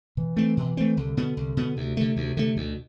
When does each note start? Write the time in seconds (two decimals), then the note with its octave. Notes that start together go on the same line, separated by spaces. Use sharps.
0.17 B2 E3
0.37 A3 C4
0.57 B2
0.77 A3 C4
0.97 C2 D3
1.17 B2 B3
1.37 C2
1.57 B2 B3
1.77 D2 C3
1.97 D3 A3
2.17 D2
2.37 D3 A3
2.57 D2 B2